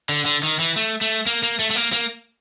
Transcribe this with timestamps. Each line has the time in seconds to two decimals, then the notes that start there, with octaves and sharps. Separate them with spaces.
0.09 D3
0.25 D3
0.43 D#3
0.59 E3
0.76 A3
1.01 A3
1.26 A#3
1.43 A#3
1.59 A3
1.71 A3
1.76 A#3
1.93 A#3